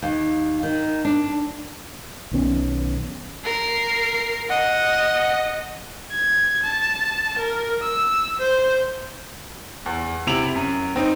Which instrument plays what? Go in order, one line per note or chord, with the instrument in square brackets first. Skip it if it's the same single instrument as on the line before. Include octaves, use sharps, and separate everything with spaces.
[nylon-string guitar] D#2
D#3
D4
[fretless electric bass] B1 D#3 B3 C#4
[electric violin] A#4 C7
[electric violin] D#5 [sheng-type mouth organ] F#5
[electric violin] G#6
A5
A#4
E6
C5
[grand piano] E2
C3 E4 D7 F7 F#7
F#2
C4 D#4